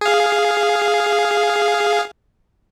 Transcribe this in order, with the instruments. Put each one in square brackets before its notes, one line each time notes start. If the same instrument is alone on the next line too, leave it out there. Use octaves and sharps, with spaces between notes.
[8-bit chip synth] G#4 F5